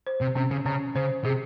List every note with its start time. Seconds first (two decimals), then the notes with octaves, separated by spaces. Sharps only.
0.06 C5
0.21 C3
0.35 C3 C#4
0.51 C#3
0.65 C#3 C#4
0.95 C#3 C5
1.24 C3 G#4